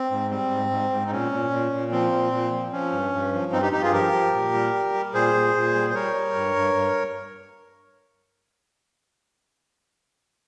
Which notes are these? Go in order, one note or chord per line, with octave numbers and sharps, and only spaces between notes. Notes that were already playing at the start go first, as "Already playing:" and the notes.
Already playing: C4
G#2
G3 C4
G#2
G#2
G#2
D#4
A#2 C#4
A#2
A#2
A#2
F3 C4
A#2
A#2
F3
F3 C#4
G2
G2
F3
G2 C4 D#4
D#4 G4
G2 D#4 G4
F4 G#4
F3 G4 A#4
F3
A#2
G3
G3
G3
A#2 G#4 C5
A#2
A#2
G3
C5
G3 A#4 C#5
G3
G2
G2
G2